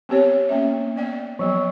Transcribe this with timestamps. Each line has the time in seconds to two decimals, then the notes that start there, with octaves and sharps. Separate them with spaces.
0.09 B3 C4 G4 C#5
0.49 A#3 C#4 E5
0.96 B3 D5 G5
1.39 F3 F#3 B3